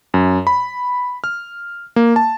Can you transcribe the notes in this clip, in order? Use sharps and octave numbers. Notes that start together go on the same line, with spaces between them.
F#2
B5
F6
A#3
A5